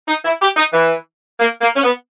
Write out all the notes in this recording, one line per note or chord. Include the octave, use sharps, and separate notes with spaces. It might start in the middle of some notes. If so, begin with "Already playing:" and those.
D#4
E4
G4
D#4
E3
A#3
A#3
C#4
B3